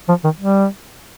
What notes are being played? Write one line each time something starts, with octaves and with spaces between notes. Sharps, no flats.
F3
D#3
G3